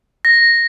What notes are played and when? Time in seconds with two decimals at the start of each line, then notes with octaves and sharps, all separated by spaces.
0.25 A#6